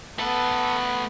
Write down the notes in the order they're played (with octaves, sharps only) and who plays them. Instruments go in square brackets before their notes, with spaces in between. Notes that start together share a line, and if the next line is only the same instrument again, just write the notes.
[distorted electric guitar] A3 B4 [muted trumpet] B3 [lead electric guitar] A4